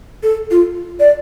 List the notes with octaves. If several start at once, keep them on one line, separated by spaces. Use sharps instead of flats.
A4
F4
D5